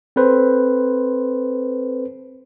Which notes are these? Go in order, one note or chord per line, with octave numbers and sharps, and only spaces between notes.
C4 A4 B4 C5